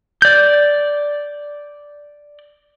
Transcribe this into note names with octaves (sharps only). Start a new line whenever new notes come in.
D5 G6